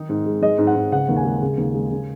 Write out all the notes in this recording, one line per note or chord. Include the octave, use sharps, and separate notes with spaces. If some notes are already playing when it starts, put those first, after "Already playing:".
Already playing: D#3 D#4
G#2
G#3
G#3 D#5
G#2
F#5
G#2
C#3 F#5
D#2
G#5
G#3
C#3
D#2
G#3
C#3